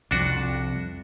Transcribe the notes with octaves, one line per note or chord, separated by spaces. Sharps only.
C2 F2 D4 F#4